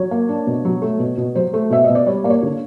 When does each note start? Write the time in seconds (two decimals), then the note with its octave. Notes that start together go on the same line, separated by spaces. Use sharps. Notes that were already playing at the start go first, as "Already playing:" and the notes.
Already playing: F#3 C#5
0.11 A#3
0.29 D4
0.47 B2
0.65 F#3
0.82 A3
0.99 B2
1.18 B2
1.35 F#3 C5
1.53 A3
1.70 B2 E5
1.84 D#5
1.89 B2
1.95 D5
2.06 G3 C#5
2.24 A#3 D5
2.30 C#5
2.43 D3